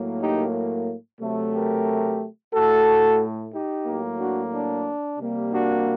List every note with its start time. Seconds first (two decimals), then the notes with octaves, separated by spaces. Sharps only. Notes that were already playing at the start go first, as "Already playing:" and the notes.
Already playing: A2 F#3 A#3
0.21 D#4 G4
1.20 C3 F#3 A3
1.54 G4 A#4
2.52 A2 A3 F#4 A4
3.53 D#4 G4
3.86 A2 F#3 A#3
4.18 D4 F#4
4.52 D4
5.18 C3 G3 A#3
5.52 D4 F#4